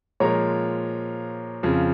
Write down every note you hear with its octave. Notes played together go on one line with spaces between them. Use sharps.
A#2 F3 G#3 A#4 C#5
F2 C#3 F3